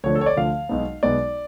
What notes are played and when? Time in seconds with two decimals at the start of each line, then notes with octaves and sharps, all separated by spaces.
0.04 D2 D3 F3 C#5
0.15 A4
0.21 C#5
0.26 D5
0.36 D2 D3 F3 F5
0.69 B1 B2 G#3 B3
1.03 B1 B2 G#3 B3 D5